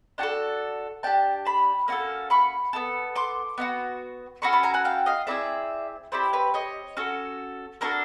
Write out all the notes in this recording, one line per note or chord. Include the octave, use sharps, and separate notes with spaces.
D4 F#4 A4 G5 A5
D4 G4 G5 A5
A5 B5
A#3 C#4 F#4 A4
B5 C#6
B3 E4 A4
C6 D6
B3 D#4 F#4
C#4 F#4 A4 B5 C#6
A5 B5
G#5 A#5
F#5 G#5
F5 G5
D#5 F5
A3 C4 E4 G#4 D5 E5
C4 E4 G4 C5 D5
B4 C#5
C#5 D#5
C#4 F#4 A4
A#3 D4 F#4 A4 A#4 C5